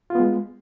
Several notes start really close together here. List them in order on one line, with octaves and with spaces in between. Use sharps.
F4 B3 G#3